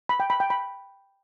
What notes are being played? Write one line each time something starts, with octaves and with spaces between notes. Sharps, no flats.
B5
G5
B5
G5
B5